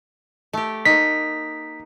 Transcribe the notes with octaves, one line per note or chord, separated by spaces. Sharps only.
A3 G4
A#3 D#4 B6